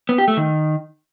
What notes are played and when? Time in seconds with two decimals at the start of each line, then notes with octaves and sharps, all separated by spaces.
0.09 B3
0.18 G4
0.28 A3
0.37 D#3